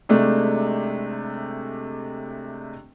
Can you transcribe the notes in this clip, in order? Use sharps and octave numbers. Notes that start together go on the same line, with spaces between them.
C3 G#3 A3 D4 D#4